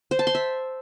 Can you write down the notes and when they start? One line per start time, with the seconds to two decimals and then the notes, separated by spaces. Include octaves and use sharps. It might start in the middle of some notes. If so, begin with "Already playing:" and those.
0.11 C5
0.19 A5
0.27 C6
0.35 E5